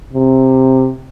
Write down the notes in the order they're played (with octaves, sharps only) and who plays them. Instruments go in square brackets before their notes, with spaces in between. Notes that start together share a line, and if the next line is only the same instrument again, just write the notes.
[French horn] C3